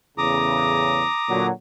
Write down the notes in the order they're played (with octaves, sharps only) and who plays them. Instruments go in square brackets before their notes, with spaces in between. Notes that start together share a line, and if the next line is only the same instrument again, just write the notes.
[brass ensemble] E2 A2 C#3 [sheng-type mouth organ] A#5 D6 D#6
[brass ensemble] A#2 D3 F#3